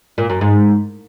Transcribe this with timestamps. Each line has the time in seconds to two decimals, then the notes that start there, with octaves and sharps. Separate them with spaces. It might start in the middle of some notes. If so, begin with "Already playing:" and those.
0.18 A#2
0.30 F#2
0.41 G#2